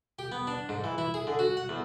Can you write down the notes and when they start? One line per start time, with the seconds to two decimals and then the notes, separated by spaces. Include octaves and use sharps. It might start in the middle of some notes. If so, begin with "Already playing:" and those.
0.19 G4
0.32 B3
0.47 D4
0.69 G#2
0.84 E3
0.98 E4
1.14 G#4
1.27 D3
1.39 F#4
1.57 F#5
1.69 E2